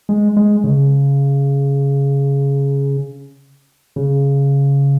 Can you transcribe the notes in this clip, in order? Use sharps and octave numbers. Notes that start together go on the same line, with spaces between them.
G#3
G#3
C#3
C#3